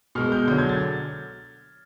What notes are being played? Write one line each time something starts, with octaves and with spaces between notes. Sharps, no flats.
B2 G#3 F6
G6
D3 F#3 G6
G#6
A6